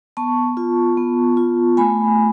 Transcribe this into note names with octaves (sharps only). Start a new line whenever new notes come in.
B3 A5 C#6
F4
B3
F4
A3 G#5 B5